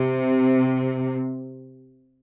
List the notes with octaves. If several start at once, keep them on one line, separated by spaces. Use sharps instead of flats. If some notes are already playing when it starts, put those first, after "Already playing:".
Already playing: C3